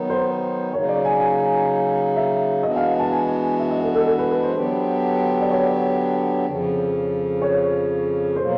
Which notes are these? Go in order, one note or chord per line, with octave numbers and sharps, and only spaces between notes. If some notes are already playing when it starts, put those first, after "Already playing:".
Already playing: D#3 F#3 B3 D#4
C5
C#3 F#3 A#3 D#4 C#5
D5
G#5
G#5
E5
E3 G#3 B3 D4 F#4 D#5
F5
A5
G#5
E5
D#5
A4
A4
A4
B4
B4
C5
D3 F#3 B3 D4 G4
D5
C#5
F2 C#3 F3
C#5
B2 F#3 A#3 C5